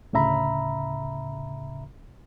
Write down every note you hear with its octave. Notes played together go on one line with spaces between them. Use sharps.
D2 A2 C#3 E5 A#5 B5